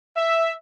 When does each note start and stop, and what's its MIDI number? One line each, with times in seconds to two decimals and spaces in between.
0.16 0.52 76